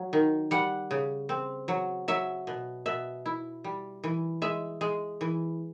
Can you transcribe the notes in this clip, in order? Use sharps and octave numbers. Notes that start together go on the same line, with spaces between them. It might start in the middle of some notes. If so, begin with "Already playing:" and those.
Already playing: F#3
D#3
G3 F#5
C#3
C4
F#3
F#3 E5
B2
B2 E5
E4
G3
E3
G#3 E5
G#3
E3